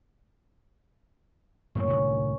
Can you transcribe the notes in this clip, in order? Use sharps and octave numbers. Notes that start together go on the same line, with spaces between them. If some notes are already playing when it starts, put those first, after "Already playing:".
F#2 A2 A#3 C#4 A#4 C#5
C2 A2 D3